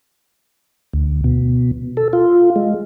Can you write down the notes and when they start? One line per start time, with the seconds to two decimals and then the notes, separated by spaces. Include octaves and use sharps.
0.93 D2
1.24 B2
1.97 A4
2.13 F4
2.56 G#3